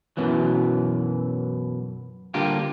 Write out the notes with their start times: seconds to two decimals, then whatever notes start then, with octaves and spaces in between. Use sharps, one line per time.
0.17 F#2 B2 E3 F#3
2.34 D3 G3 A#3 D4 F4 G4